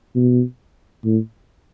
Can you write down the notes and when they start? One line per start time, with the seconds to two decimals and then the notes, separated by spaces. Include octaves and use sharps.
0.15 B2
1.04 A2